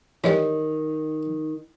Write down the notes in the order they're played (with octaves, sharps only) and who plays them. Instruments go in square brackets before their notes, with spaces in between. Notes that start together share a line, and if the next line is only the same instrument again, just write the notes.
[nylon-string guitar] D#3 [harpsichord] E3 G3 [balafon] C#5 D#5